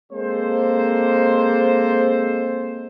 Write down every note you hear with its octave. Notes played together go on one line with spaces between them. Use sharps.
G#3 A#3 C4 A4 C5